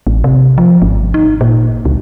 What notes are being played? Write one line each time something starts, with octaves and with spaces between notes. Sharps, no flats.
A1
C3
F3
G#1
D#4
A#2
C#2